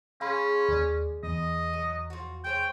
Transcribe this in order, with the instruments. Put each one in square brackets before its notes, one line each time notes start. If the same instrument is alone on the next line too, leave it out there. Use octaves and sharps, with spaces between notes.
[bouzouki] G#3 G#4 G#5 [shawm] C#4 [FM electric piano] F5 B5 C6
[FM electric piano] D#2 D5
[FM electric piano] E2 [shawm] D#5
[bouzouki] F#3
F3 F#4
[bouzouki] G#3 C5 C#5 [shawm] G5